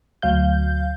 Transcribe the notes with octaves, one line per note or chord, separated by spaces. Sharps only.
D2 F#3 F5 G6